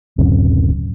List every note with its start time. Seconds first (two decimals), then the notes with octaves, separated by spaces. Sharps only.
0.18 D1 F#2 C#3 C4